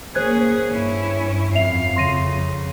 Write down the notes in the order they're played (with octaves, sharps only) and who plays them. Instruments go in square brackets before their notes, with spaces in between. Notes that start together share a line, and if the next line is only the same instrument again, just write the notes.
[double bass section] A#3 [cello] C#4 G#4 [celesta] C5 F#6 G#6
[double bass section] G2 [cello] C#4 E4
[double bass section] F2 [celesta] E5 F7 [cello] F5
[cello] C#3 [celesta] C6 A#6 D#7